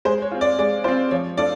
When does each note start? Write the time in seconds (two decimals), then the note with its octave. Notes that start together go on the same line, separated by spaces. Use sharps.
0.05 G#3 C5
0.22 C#5
0.31 C4 F4
0.41 D5
0.59 G#3 D5
0.84 C4 F4 C5
1.11 F3 C#5
1.37 A3 D4 F4 A4 D5